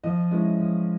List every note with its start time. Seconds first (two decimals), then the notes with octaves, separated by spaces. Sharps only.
0.04 F3 D#5
0.31 G#3 C#4 E4
0.59 F3